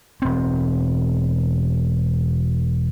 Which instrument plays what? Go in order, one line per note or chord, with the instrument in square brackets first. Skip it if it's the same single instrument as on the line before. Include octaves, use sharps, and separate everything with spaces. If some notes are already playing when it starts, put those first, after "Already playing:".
[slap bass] E1 C4